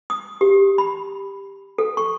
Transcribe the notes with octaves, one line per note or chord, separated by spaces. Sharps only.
D#6
G4
B5
A4
C#6